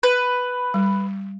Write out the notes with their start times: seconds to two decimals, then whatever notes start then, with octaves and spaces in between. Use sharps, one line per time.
0.03 B4
0.74 G3